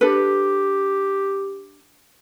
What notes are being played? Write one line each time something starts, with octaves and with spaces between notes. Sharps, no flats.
D4 G4 A4 B4